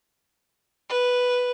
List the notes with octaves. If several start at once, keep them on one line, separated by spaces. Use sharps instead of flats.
B4